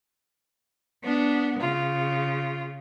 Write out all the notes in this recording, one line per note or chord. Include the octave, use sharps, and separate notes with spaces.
B3 D4
C#3 F4